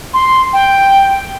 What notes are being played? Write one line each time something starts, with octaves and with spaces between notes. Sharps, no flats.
C6
G5